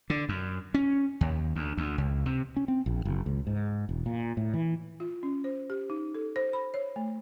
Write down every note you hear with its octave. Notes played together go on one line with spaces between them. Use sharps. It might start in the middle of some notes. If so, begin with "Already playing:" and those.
D3
F#2
C#4
D#2
D2
D2
C#2
C3
C#4
C4
A#1
F#1
C#2
G#2
E1
A#2
A2
E3
F4
C#4
C5
G4
D#4
A4
C5
B5
C#5
A3